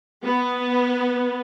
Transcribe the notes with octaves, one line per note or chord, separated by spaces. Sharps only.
B3